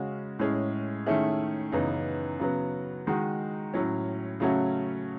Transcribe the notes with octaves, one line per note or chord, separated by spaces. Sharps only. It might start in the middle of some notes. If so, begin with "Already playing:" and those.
Already playing: C#3 G#3 C#4 F#4
A2 G#3 C#4 G#4
D#3 A3 C#4 E4 G#4
F#2 C#3 E3 B3 D#4
C#3 F#3 B3
D#3 G#3 D#4 F#4
A2 F#3 C#4
C#3 F#3 A3 C#4 F#4